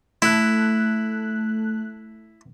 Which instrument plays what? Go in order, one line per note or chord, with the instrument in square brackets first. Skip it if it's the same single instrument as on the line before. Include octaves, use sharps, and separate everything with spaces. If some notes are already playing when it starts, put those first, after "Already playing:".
[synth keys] A3 F#6 [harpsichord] E4